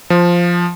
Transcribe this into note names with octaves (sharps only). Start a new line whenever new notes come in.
F3